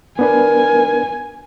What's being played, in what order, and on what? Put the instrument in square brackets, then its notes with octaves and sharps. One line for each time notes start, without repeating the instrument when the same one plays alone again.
[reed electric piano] B3 D4 B4 [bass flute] A#4 [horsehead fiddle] G#5